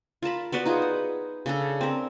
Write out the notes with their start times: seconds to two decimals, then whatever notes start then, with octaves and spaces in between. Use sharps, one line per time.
0.23 F4 A#4 A5 B5
0.52 B3 F#4 B4 D5
0.66 D#4 F4 G#4
0.82 F#5
1.46 C#3 D4 A4
1.81 C4 A#4